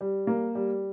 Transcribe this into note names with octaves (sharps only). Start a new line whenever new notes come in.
G3
A#3
G3